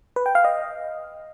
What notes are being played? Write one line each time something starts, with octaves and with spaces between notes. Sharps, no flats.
B4
G5
F5
D#5